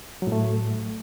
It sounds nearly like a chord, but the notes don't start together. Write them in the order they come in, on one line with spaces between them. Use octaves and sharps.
F#3 A2 A3